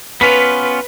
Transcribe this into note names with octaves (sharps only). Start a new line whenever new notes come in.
B3 C#4 F4 B4 B6